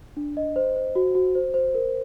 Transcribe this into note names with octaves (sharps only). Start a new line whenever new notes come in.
D4
D#5
C5
C5
F#4
F#4
C5
C5
A#4